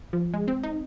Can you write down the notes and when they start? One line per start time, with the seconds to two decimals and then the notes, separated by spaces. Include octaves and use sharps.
0.13 F3
0.34 G#3
0.48 C4
0.63 D#4